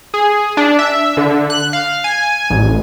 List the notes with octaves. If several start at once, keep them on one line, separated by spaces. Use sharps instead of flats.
G#4
D4
E5
D3
F#6
F5
G#5
A1